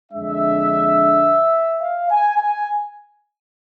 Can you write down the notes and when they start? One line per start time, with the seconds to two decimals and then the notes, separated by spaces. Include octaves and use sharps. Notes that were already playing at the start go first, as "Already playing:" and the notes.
0.12 F2 D3 G#3 D4 E5
1.81 F5
2.11 G#5
2.38 G#5